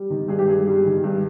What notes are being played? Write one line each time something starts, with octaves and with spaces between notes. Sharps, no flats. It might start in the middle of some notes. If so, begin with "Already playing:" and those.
Already playing: G3
D#3
G2 G#4
G4
G2 G#4
G3
D#3
G2